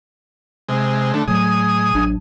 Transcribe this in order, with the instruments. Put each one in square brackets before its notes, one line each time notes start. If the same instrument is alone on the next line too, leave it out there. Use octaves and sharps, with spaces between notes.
[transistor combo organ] C3 G#3
D3 A3
[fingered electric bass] A2 F#3 A3 [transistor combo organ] G#4 D#6
[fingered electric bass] A1 F#3 D4